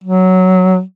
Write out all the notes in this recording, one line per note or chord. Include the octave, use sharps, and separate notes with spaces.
F#3